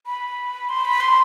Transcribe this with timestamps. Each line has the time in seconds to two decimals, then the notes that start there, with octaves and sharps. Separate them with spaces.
0.06 B5
0.69 C6
0.85 B5
1.01 C6